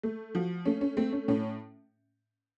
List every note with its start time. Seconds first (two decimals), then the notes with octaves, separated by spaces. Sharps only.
0.03 A3
0.34 F3 F#4
0.65 A3 C#4
0.81 C#4
0.97 A3 C4
1.13 C#4
1.28 A2 C#4